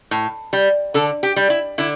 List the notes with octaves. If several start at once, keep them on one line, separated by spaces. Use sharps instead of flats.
A2
G3
D3 A4
G4
G3
E4
D3 E4